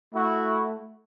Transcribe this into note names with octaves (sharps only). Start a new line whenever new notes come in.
A3 E4 F#4